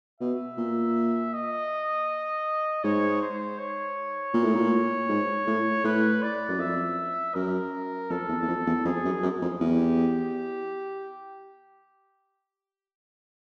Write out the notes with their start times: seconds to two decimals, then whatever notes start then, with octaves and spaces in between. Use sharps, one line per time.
0.20 B2 E5
0.57 A#2
1.33 D#5
2.84 G#2 C#5
3.21 C5
3.59 C#5
4.34 A#2
4.44 A2
4.55 A#2
5.09 G#2
5.47 A2
5.84 A2 B4
6.22 D5
6.49 F#2
6.59 F2 E5
7.34 F#2 A#4
8.10 F2 A4
8.29 E2
8.42 E2
8.48 F2
8.67 E2
8.85 F2 G#4
9.05 F#2
9.23 F#2
9.42 F2
9.61 E2 G4